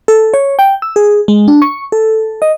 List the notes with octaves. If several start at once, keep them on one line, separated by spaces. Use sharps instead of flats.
A4
C#5
G5
E6
G#4
G#3
D4
C#6
A4
D#5